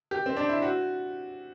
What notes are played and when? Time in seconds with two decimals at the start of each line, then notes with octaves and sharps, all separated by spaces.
0.11 G4
0.26 C4
0.37 D4
0.49 E4
0.62 F#4